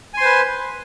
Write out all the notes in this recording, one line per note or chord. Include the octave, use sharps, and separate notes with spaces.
B4 C5 G#5 C6